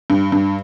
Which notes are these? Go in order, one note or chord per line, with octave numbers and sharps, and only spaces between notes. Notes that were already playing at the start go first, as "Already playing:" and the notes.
G2
G2